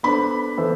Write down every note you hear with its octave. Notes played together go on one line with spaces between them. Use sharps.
B3 D4 A4 C5 B5
E3 B3 E4 A4 C5